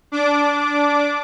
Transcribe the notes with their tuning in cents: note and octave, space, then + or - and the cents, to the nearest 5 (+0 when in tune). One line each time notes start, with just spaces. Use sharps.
D4 -15 D6 +0